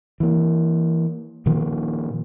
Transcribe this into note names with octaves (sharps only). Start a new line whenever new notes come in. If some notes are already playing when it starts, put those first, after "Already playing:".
E3 A#3
A#2 D#3 F3 A#3